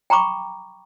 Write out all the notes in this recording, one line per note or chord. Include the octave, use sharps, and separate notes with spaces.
G5 A#5 B5 C#6 D6